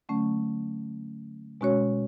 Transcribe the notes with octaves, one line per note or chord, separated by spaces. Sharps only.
D3 F#3 A3 C#4
B2 G#3 C#4 F#4 C#5